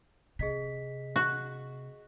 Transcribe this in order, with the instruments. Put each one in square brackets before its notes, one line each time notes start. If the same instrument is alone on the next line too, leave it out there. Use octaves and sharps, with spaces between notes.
[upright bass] C3 [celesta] G#4 D#5 B6
[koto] F#4